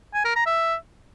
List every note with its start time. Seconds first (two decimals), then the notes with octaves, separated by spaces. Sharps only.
0.14 G#5
0.25 A#4
0.36 A#5
0.47 E5